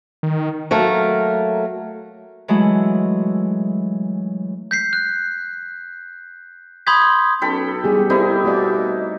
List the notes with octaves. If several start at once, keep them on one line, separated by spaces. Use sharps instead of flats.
D#3
F#3 A3 A#3 A#4
E3 F#3 G#3 A3 E4 F#4
G6 B6 C7
F#6
B5 C6 D#6 G6 G#6 B6
B1 C#4 A4 G5 B5
E1 G3 B3 G4 G#4
C2 C4 D#4 E4 G4 A4 C5
B2 A3 D5